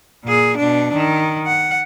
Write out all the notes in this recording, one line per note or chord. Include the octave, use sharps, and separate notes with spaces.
A#2 G#4
B2 D4
D#3
F#5